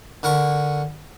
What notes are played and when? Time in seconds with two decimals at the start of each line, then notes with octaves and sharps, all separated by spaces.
0.23 D3 A#4 C#6